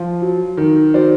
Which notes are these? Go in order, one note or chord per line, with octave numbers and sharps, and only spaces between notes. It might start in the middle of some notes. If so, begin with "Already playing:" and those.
Already playing: F3
F#3
D#3
F#3 C5 D5